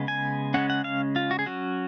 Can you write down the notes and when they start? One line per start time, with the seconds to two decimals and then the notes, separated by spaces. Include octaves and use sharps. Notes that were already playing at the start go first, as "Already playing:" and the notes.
Already playing: C#3 G#3 B3
0.08 G#5
0.54 C#3 G#3 C#4 F#5
0.70 F#5
0.84 F5
1.16 F4
1.31 F#4
1.39 G#4
1.46 F#3 C#4 F#4